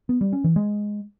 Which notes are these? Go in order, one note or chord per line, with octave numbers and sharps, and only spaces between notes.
B3
G3
C#4
E3
G#3